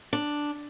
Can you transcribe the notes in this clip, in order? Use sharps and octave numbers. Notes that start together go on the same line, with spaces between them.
D4